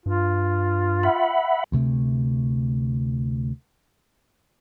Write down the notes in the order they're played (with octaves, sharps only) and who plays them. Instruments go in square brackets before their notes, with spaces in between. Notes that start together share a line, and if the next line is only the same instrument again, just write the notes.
[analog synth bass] G2 [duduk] F4
[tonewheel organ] E5 F#5 B5
[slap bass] D2 C3 A3